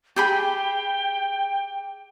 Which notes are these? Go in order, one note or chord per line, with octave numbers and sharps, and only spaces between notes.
G4 G#4 G5 B5